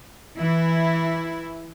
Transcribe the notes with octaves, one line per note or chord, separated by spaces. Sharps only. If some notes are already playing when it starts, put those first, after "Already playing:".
E3 E4